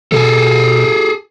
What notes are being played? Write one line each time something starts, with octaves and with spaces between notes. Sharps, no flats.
B2 G#4 A4